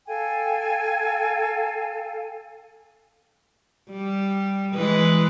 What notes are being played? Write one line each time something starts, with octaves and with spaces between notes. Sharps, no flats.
A4 F5 G5 G#5
G3
E3 G#3 B4